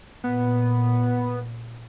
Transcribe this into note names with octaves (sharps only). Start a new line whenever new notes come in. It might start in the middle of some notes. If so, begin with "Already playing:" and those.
A#2 B3